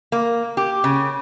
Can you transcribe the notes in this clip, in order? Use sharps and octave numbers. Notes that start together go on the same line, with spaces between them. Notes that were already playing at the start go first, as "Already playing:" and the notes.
A#3
G4
C#3